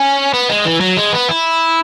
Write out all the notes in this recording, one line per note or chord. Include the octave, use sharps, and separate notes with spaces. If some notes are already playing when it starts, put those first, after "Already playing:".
Already playing: C#4
B3
G#3
E3
F#3
G#3
B3
E4